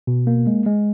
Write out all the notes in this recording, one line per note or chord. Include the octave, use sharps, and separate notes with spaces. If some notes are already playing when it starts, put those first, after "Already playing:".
B2
A#3
G#3
G#3